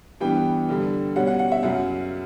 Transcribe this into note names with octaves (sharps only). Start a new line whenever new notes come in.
G2 E3 G3 B3 G5
G2 D3 G3
B2 G3 C#4 F#5
F#5
F#5
E5
F#2 C#3 F#3 F#5